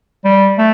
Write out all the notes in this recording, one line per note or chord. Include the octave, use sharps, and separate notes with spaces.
G3
A3